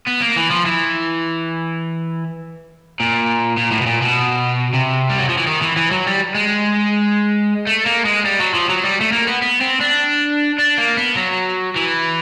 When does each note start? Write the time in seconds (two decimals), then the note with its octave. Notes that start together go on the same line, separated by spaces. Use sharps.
0.08 B3
0.22 A#3
0.36 E3
0.51 F3
0.66 E3
3.00 A#2
3.58 A#2
3.72 A2
3.81 B2
3.87 A#2
4.02 B2
4.74 C3
5.10 G3
5.19 F#3
5.29 F3
5.38 E3
5.47 D#3
5.62 E3
5.76 E3
5.91 F#3
6.07 G3
6.35 G#3
7.66 A3
7.86 A#3
8.05 G#3
8.25 G3
8.40 F#3
8.54 F3
8.69 F#3
8.84 G3
9.01 A3
9.12 A#3
9.27 B3
9.42 B3
9.61 C4
9.81 D4
10.58 D4
10.78 A#3
10.97 B3
11.17 F#3
11.76 E3